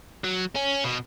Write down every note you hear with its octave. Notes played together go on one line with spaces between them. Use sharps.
F#3
C#4
B2